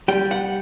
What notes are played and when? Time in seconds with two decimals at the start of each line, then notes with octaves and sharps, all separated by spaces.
0.08 G3 G5
0.31 F#5